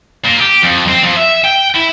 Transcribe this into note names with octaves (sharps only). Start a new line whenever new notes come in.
A#2
G4
F2
C4
F2
E5
G5
E4